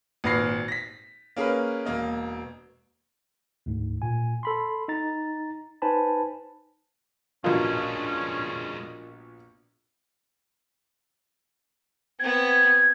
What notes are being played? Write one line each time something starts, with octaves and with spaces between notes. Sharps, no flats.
G#1 A#2 B4 F6 A#6 C7
A#6 B6
A#3 C#4 G#4 A#4 B4
E1 A#3 D#5
D2 G#2
A#2 G#5
A4 B5 C6
D#4 A#5 A6
D#4 B4 C5 G#5 A5 B5
A#1 B2 G#3 C#4 D4 F4 A#4 D#5
B3 C4 G#6